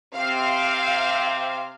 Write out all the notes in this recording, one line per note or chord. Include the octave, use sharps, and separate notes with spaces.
C3 C4 F5